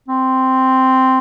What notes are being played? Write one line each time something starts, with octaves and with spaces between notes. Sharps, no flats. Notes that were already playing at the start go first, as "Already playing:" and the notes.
C4